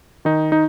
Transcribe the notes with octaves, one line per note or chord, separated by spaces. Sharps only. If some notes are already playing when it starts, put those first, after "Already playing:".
D#3 D#4
D#4